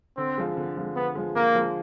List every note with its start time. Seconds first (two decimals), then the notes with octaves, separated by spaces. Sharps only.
0.17 D3 C4
0.38 F3 G#3
0.57 D3
0.77 F3 G#3
0.95 D3 B3
1.15 F3 G#3
1.36 D3 A#3
1.55 F3 G#3